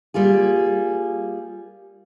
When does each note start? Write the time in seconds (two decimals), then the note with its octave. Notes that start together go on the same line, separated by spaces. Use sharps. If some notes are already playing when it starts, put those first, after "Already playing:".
0.14 G3 A#3 F4 G#4